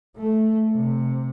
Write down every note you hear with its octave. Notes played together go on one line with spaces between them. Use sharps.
A3
C3